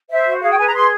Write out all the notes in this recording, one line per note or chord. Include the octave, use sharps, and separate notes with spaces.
C5 E5
F#4
G#4 F5
G5
B4 G#5
A#5
G#4 C6